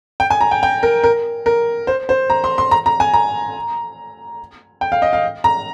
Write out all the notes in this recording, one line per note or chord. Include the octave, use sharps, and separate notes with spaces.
G5
G#5
A#5
G5
G5
A#4
A#4
A#4
C5
C5
A#5
C6
C6
A#5
A#5
G#5
A#5
G5
F5
D#5
F5
A#5